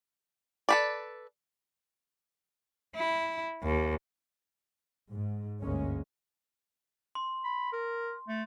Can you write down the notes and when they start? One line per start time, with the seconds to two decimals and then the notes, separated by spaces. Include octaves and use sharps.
0.69 A4 B4 D5
2.95 E4
3.63 D#2
5.10 G#2
5.61 G1 D2 G#3 A#3 C#4
7.15 C6
7.44 B5
7.73 A#4
8.28 A3